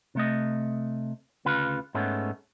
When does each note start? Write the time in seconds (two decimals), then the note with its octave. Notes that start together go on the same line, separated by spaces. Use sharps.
0.15 C3 A3 D#5
1.45 D2 C#3 F4 B4
1.95 G#2 G#3 A3 B3 C#4